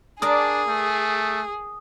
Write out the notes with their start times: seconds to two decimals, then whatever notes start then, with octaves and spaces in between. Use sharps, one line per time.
0.22 D4 G#4 A#4 D5 A5 D#6
0.68 A3